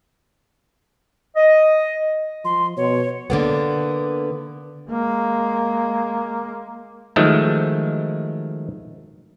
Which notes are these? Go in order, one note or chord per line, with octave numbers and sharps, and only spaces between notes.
D#5
F3 C6
B2 C#5
D3 A#3 B3
G#3 A#3
D#3 F3 F#3 G#3 A3